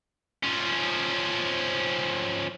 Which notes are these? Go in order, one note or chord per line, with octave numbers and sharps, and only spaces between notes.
F3 C#4